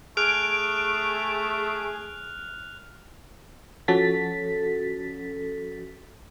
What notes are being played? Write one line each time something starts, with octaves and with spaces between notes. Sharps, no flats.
A3 G#4 F6 F#6 D7 F7
F3 C#4 F#4 A4 A6 B6